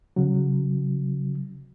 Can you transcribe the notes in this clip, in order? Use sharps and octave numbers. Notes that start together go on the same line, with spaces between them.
C#3 F#3